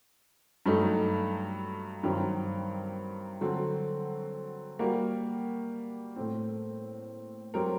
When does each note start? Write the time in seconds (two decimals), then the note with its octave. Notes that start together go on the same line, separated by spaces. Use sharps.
0.66 G2 F#3 A3 D#4 A4
2.03 G2 D#3 F#3 C4
3.41 D3 F#3 C4 F#4
4.79 G3 A#3 F#4 A#4
6.16 A2 A3 C4
7.54 F#3 C4 G4 A#4